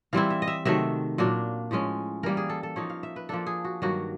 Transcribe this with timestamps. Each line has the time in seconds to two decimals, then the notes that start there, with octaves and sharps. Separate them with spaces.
0.13 E3 G3 C4 E4 F5
0.30 E5
0.42 D#5
0.48 E5
0.65 C3 D#3 F#3 A3 E5
1.18 A#2 F#3 A#3 D4
1.71 A2 F3 G#3 C#4
2.23 E3 G3 A#3 A#4
2.37 G#4
2.50 A4
2.63 A4
2.76 F3 A#3 D#4 C#5
2.90 F5
3.03 E5
3.16 B4
3.29 F3 A#3 D4 A4
3.47 G#4
3.64 F#4
3.82 G2 D#3 F#3 A#3 F#4